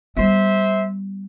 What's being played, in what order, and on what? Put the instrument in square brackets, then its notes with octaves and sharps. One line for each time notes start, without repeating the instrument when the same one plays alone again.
[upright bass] G3 B3 [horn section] C5 E5